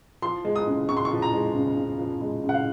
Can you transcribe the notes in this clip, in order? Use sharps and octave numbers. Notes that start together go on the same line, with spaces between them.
F3 C6
G#3
D#6
C#3
C#3 C#6
C6
C#6
F3
A#5
G#3
C#3
C#3
F3
G#3
C#3
F#5
F5